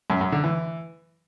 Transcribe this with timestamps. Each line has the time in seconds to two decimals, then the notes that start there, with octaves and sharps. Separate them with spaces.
0.10 F#2
0.21 F#2
0.32 D3
0.44 E3